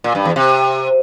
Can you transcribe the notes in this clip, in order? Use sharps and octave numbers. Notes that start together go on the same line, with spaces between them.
A#2
G2
E2
C3